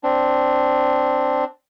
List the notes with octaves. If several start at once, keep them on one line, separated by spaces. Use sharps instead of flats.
C4 D4